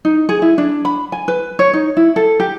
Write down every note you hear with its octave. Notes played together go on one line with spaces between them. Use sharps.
D#4
G#4
E4
D4
B5
G#5
B4
C#5
D#4
E4
A4
G4